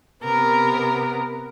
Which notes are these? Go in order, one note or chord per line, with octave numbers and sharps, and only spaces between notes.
C3 B3 A#4